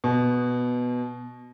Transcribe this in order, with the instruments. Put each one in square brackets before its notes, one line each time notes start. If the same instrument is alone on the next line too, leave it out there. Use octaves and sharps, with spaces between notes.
[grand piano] B2